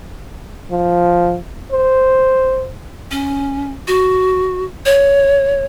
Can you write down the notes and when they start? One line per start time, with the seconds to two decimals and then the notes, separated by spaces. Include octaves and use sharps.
0.71 F3
1.72 C5
3.11 C#4
3.87 F#4
4.85 C#5